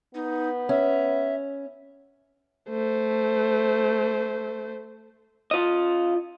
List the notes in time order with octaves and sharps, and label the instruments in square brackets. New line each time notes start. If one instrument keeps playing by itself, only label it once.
[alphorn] B3 [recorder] D#4
[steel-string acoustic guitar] C#4 [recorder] E5
[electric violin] A3 C5
[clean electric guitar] F4 D#5